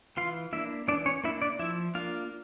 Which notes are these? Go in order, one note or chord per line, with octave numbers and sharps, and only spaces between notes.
E3 F4 F5
A#3 D4 E4 E5
E3 D4 D5
C#4 C#5
A#3 D4 E4 E5
D4 D5
F3 E4 E5
A#3 D4 F4 F5